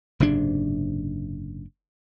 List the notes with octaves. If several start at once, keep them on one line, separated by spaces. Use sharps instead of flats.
F#1 G#2 C3 D4